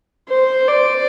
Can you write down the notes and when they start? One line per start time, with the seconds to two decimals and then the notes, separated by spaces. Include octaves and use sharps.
0.29 C5
0.68 D5